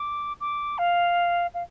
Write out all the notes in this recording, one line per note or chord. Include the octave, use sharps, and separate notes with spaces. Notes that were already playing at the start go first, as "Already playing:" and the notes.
Already playing: D6
D6
F5
F5